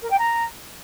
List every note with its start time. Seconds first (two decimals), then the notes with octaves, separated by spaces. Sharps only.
0.02 A#4
0.10 G5
0.19 A#5